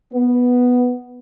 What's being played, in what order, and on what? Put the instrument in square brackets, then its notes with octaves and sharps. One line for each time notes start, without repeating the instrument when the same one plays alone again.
[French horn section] B3